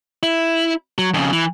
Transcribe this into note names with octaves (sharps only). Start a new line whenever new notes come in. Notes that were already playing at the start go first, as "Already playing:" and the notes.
E4
F#3
F2 C#3
E3